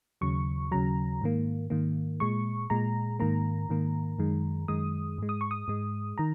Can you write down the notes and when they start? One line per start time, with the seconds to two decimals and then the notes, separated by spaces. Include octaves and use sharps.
0.21 D#2 C#3 F#3 C#6
0.72 D#2 C#3 F#3 A#5
1.21 G#2 D#3 A#3
1.70 G#2 D#3 A#3
2.20 A#2 G#3 C#6
2.70 A#2 G#3 A#5
3.20 G#2 D#3 A#3 A#5
3.69 G#2 D#3 A#3
4.19 F#2 D#3 G#3
4.68 F#2 D#3 G#3 D#6
5.18 G#2 G#3
5.29 D#6
5.41 C#6
5.51 D#6
5.68 G#2 G#3
6.18 D#3 A#5